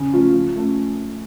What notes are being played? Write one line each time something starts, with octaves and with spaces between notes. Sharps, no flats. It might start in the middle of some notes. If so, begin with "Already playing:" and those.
Already playing: C#3
F3 A3 C#4 F4
F3
A3 C#4